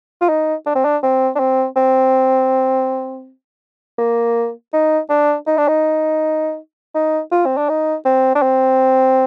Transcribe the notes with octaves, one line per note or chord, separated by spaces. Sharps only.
F4
D#4
D4
C4
D4
C4
D4
C4
C4
A#3
D#4
D4
D#4
D4
D#4
D#4
F4
C4
D4
D#4
C4
D4
C4